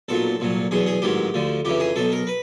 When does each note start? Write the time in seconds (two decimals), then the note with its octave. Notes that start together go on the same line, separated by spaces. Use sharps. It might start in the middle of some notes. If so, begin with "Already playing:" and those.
0.08 B1 A#2 F#3 A4
0.40 C2 A#2 F#3
0.71 E2 B2 F#3 G#4
0.86 G#4
1.02 A1 G#2 D#3 F#3 G4
1.34 D2 D3 F3
1.65 F2 C#3 E3 G4
1.80 G#4
1.96 B1 B2 F#3 A4
2.12 A#4
2.27 B4